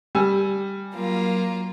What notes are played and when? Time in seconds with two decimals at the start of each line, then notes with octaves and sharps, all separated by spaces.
0.15 G3 G#5 E6
0.94 F#3 A#3 F4